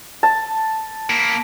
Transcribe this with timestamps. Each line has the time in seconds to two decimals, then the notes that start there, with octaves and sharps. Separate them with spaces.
0.23 A5
1.10 A#3 E4